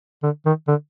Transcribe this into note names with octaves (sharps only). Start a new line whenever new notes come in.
D3
D#3
D3